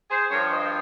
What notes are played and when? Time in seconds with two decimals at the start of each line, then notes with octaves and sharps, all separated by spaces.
0.10 G#4 C5
0.31 G2 F3 A#4 C#5
0.51 C5 D#5